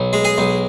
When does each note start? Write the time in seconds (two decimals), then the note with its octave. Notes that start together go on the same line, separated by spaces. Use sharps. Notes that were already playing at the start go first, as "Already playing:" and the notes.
Already playing: B1
0.13 G#3
0.24 G#4
0.38 B1